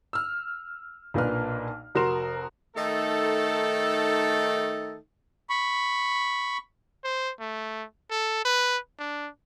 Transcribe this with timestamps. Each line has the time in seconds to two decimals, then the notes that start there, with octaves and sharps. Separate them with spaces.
0.13 E6 F6
1.14 B1 A#2 A#3 D4 B4 F6
1.95 F1 F#4 A#4 C6 E7
2.76 D#3 A3 D#4 A4
5.50 B5 C#6
7.04 C5
7.40 A3
8.11 A4
8.45 B4
8.99 D4